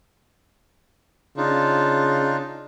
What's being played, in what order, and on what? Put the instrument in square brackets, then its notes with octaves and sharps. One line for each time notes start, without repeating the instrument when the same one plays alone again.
[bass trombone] C#3 [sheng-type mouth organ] D4 D#4 F4